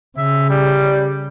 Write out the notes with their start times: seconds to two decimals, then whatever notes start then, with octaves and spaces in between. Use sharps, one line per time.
0.18 C#3 E5
0.50 G3